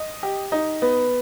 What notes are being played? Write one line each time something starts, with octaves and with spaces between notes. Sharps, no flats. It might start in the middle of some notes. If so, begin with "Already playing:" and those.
Already playing: D#5
G4
D#4
B3